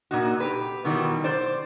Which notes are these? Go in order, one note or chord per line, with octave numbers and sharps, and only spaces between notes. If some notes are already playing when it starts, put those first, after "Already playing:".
A#2 D#4 F#4
G4 B4
B2 D#3 E3 F#3 G3
C5 D5